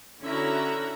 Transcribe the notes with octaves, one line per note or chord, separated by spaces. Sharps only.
D3 C#4 E4 F#4 E5 A#5